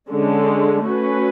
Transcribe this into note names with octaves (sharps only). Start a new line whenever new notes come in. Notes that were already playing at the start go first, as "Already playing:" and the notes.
D3 G#3 C#4
A3 C#4 F#4 B4